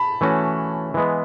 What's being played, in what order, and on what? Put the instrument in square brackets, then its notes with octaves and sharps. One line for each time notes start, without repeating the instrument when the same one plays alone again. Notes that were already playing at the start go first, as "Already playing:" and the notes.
Already playing: [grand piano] A5 B5
[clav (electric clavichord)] E3 A3 C#4 F#4
E3 G#3 B3